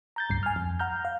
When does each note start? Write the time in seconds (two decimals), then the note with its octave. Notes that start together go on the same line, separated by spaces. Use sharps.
0.16 A#5 G6 A6
0.30 C#2 G2 C7
0.43 G#5 F6
0.56 F2
0.79 F#5 A#5 F6 G6
1.05 F5